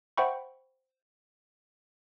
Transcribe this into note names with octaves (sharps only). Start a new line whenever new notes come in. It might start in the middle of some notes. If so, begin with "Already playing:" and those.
C5 E5 F#5 G5 B5 C#6